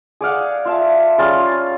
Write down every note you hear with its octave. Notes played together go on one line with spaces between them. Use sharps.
G#4 D5 F5 F#5
F4 E5 A5
G3 C#4 F4 G#4